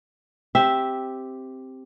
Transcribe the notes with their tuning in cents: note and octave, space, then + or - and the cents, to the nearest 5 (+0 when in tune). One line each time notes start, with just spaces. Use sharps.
C4 +0 G4 +0 E5 -5